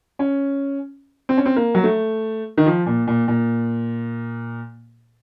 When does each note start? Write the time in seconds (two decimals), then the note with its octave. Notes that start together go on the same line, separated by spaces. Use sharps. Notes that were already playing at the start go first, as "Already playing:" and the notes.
0.19 C#4
1.29 C4
1.37 C#4
1.46 C4
1.56 A#3
1.75 F#3
1.84 A3
2.57 D#3
2.66 F3
2.86 A#2
3.07 A#2
3.28 A#2